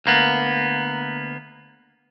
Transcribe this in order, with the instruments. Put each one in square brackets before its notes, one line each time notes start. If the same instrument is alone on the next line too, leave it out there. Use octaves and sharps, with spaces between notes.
[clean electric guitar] D2 A#3 B3